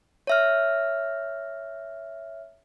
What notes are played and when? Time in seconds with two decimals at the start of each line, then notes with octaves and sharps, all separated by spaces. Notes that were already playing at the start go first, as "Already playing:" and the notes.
0.27 C#5 E5 F6